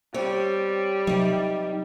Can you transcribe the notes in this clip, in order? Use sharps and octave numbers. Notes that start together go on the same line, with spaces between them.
G3 C4 C#5
C3 F#3 D#4